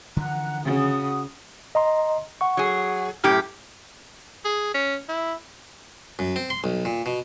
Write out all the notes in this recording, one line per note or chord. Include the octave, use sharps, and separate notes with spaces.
D3 E3 F3 F#5 A#5 F#6
C#3 F#4 D#6
D#5 A#5 C6
F#5 C#6
F#3 G#4
F#2 A2 G4 F6
G#4
C#4
E4
F#2
C4
C6
B1
A#2
B2